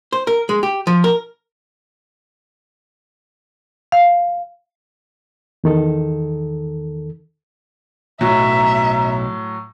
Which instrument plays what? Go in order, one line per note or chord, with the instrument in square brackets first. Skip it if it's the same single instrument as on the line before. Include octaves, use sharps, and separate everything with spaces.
[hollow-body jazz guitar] C5
A#4
G#3
G4
F3
A#4
[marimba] F5
[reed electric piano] E2 D#3 A4
[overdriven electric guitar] B1 [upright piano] A2 F#3 [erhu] E5 [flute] A#5